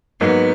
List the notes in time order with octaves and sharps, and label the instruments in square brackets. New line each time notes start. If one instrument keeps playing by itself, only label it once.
[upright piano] G#2 F#3 A#3 D#4 [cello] B3